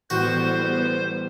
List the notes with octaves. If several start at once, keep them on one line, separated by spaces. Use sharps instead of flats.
A1 G3 B3 F#4 C5 D#7